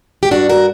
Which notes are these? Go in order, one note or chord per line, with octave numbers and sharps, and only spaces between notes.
G4
G2 D4 F#4
F#4 A#4